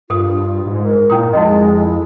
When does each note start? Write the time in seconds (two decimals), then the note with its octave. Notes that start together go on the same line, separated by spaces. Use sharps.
0.10 G2 F4 A4 D#6
0.66 G#2
0.83 A#4
1.10 A#2 C#4 E4 D#6
1.33 F2 G#3 D#4 F#4 D#5
1.74 E4